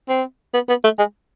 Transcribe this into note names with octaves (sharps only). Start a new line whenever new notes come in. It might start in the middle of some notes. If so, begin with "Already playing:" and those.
C4
B3
B3
A3
G#3